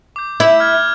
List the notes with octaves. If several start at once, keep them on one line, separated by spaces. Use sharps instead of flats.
D6 G6
E4 E5 D6 E6 G6
F6 G6 G#6